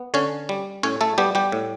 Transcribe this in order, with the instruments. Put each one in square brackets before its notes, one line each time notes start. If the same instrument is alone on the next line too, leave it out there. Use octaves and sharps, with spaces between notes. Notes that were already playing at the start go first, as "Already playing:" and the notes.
Already playing: [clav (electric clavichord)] B3
D3 C#4 C#5
G3
A2 C#4 C#5
A3 A4
G3 B3 G4
G3 G4
A2